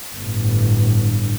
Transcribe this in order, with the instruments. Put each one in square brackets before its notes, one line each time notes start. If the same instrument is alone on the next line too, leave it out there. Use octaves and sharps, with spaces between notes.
[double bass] G1 A2